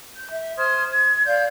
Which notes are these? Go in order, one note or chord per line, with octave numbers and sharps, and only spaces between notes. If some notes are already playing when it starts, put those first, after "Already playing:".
G6
E5
C5 D#6 F6 G#6
G#6
D5 F5 G6